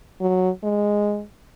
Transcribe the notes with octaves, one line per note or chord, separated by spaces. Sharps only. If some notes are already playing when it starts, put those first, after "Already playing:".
F#3
G#3